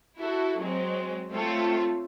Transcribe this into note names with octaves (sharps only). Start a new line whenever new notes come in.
E4 F#4 A4
F#3 G#3 C4
A3 C4 F4 A4 C#5